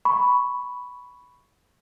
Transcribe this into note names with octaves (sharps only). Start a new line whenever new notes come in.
B5 C#6